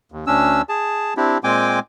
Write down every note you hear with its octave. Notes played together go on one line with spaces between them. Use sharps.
D#2
D2 C#4 D4 E6
G#4 A5
C4 D4 E4 G4
A#2 G#3 C4 G5 G#5 D6